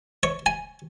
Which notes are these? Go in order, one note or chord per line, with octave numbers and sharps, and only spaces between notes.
C#5
G#5